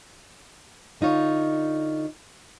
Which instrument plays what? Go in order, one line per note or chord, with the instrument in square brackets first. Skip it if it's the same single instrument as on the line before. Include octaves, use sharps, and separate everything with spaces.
[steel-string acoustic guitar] D3 D#4 F4 C#5